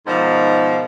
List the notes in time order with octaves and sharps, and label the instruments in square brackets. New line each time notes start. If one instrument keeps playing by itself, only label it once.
[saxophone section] G#2 B2 D#3 F3